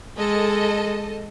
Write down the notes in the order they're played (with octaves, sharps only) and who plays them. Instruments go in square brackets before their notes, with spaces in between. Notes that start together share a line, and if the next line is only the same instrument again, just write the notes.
[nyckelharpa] G#3 [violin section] A4 D#5